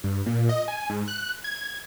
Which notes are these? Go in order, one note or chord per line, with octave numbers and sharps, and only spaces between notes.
G2
A#2
D#5
G#5
G#2
F#6
G#6